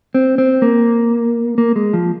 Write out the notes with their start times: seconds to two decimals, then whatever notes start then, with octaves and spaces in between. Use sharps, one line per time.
0.15 C4
0.38 C4
0.62 A#3
1.58 A#3
1.76 G#3
1.93 F3